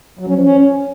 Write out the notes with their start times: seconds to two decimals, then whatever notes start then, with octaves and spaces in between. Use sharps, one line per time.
0.19 F#3
0.27 C#4
0.35 F3
0.43 C#4